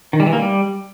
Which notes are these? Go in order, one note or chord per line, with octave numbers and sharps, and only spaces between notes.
D#3
G3
E3
A#3
G3